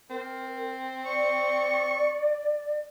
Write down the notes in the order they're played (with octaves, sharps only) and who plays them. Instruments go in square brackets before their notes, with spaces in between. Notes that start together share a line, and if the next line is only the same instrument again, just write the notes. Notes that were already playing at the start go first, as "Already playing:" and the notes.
[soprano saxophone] C4 [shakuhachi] A#4
[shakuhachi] D5 [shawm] C#6